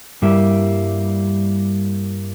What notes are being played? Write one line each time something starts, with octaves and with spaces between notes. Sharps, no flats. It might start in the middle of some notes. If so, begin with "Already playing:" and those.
G2 G3 A#3 E4